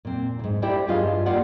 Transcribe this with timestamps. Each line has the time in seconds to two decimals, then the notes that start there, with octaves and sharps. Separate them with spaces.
0.05 A#2 C4
0.39 D2 G#2
0.62 A3 E4 G4 C5 D5 G5
0.88 G2 F4 G#4 D#5 F5
1.26 A#3 F4 G4 D5 F5 F#5